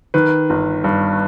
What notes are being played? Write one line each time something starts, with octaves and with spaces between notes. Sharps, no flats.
D#3 B4
G1
G2